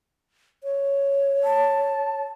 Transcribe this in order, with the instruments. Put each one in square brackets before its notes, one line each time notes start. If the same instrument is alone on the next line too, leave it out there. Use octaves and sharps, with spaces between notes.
[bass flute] C#5
[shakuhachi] A5